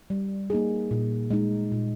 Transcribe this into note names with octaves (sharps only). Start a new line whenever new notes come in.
G3
A#3 D#4 G#4
A#2
G#3 D#4
A#2